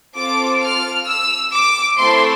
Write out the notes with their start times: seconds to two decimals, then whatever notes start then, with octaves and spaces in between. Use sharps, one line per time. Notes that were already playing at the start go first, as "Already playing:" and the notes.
0.16 C4 F4 A4 D6
0.61 F6
1.07 E6
1.52 D6
1.97 A3 C4 E4 A4 C6